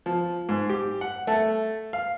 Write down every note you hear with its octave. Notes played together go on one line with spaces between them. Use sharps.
F3
G#2
G4
F#5
A3
F5